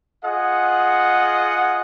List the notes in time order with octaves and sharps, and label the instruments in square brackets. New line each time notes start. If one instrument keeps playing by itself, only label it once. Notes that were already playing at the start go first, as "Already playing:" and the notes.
[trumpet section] F4 G#4 D#5 F#5